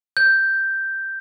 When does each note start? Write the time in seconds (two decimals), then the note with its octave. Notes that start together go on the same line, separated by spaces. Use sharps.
0.17 G6